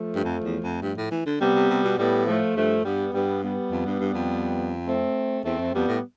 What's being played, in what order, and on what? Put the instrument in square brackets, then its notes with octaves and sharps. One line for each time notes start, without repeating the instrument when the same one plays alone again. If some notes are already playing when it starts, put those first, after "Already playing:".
Already playing: [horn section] F3 A3
[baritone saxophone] G2
F2
E2
F2
G2
A2
E3
D3
[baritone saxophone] C3 [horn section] G3 B3
[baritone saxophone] C3
C3
B2
[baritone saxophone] A2 [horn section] G3 B3
[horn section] F3 A3
[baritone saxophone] G2 [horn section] F3 A3
[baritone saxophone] G2 [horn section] G3 B3
[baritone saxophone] G2 [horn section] G3 B3
[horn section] G3 B3
[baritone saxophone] F2
G2
G2
F2
[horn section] A3 C4
[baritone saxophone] E2 [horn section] A3 C4
[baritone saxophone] F2
[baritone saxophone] F2 [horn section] G3 B3
[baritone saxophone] A2